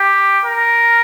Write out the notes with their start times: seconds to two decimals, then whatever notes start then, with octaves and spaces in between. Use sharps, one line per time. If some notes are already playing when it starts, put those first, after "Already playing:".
Already playing: G4
0.45 A#4